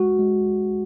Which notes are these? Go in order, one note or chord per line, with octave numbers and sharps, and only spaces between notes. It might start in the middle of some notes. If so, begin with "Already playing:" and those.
Already playing: G#3 F#4
G#3